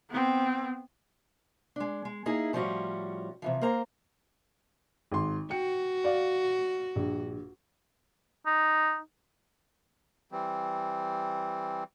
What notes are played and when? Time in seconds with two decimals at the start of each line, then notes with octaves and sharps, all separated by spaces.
0.10 B3 C4
1.76 G#3 D4
2.05 G#3
2.26 A#3 D#4 E4 G#4
2.53 A2 F3 G3 C#4 F#4
3.42 C3 E3 F3
3.61 A#3 A#4 C5 A#5
5.11 G#1 C6
5.50 F#4 G5 C#7
6.04 D5 F5
6.96 A#1 G2
8.46 D#4
10.32 E3 G3 C4